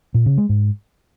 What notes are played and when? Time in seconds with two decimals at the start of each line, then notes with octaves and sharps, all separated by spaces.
0.14 A#2
0.26 C#3
0.38 G#3
0.49 G#2